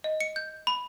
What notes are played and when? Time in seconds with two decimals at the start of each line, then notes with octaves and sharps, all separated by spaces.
0.04 D#5
0.20 C#7
0.36 G6
0.67 B5